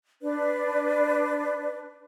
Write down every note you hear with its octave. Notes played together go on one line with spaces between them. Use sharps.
D4 B4 D5